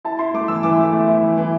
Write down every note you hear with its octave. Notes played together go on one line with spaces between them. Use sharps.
E4 A5
E4 C6
A3 D6
E3 E6
E3 D6
A3
A3
E4
E3
E3